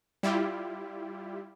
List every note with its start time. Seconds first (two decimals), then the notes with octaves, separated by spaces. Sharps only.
0.23 G3 E4 F4 G4